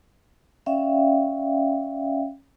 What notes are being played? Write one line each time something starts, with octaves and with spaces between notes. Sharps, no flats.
C#4 D5 E5 F5 G5